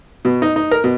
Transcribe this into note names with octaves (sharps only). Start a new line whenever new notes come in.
B2
D#4
D#4
A#4
B2